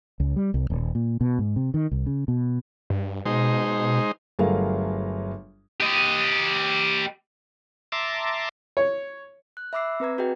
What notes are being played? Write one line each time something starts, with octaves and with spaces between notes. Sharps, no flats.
C#2
G3
C2
D#1
A#2
B2
G#2
C3
D#3
C2
C#3
B2
G2
B2 G#3 D#4 C5
G1 F#3 A3 G#4 A#4 F5
G4 D#5
E5 A5 A#5 C6 D6
C#5
F#6
E5 B5 D6 E6 C7
C4 B4 A#5 G#6
F#4 G#4 B4 D#5 G5